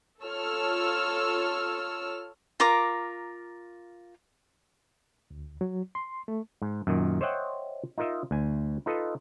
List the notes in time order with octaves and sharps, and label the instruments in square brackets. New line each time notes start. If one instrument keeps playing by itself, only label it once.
[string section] F4 A4 C#5 E6 F6
[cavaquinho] F4 A#4 A#5 D6
[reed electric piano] D2
F#3
C6
A3
[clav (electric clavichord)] G#2
F#2 A#2 D#3
C5 C#5 D#5 E5 F#5 G5
D#4 F4 A#4 D#5 E5
D2 G#5
D#4 F4 A4 B4 D#5